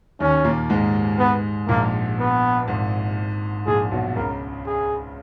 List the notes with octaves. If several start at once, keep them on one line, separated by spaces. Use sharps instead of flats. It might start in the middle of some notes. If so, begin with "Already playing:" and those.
D#2 D#3 C#4
A#2 A#3
G#2 G#3
B3
A#1 A#2 A#3
B3
G#1 G#2
A#1 A#2 G#4
B1 B2
C#2 C#3 A#4
G#4